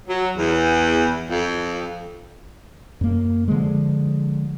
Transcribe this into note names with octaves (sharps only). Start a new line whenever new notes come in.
F#3
E2
F2
F#2 A#3
D3 F3 G#3